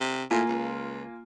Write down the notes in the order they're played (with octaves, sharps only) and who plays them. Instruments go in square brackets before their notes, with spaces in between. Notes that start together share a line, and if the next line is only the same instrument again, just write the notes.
[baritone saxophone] C3
[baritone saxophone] A2 [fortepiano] A#3 F4 G#5
[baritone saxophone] C#2